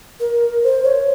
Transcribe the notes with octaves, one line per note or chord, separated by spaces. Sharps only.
A#4
C5
C#5